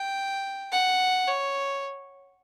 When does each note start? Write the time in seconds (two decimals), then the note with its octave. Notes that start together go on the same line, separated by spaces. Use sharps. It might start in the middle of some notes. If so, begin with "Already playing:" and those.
Already playing: G5
0.72 F#5
1.27 C#5